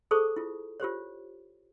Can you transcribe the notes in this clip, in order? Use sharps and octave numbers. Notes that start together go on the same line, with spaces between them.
G#4 A4 C5 A5 C#6 D#6
E4 F4
F4 G4 C5 C#5